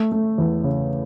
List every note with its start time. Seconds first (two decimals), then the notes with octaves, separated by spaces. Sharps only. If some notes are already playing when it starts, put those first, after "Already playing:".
Already playing: A3
0.12 A3
0.38 E2
0.64 C#3